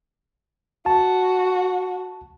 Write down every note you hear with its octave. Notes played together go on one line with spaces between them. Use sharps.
F#4 A5